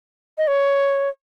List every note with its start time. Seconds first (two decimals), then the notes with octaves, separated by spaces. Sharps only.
0.38 D#5
0.47 C#5